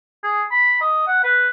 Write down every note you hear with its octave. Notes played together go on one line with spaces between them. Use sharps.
G#4
B5
D#5
F#5
B4